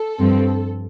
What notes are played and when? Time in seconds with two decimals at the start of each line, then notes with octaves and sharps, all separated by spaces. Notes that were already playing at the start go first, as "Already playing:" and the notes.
Already playing: A4
0.19 G2 F3 C4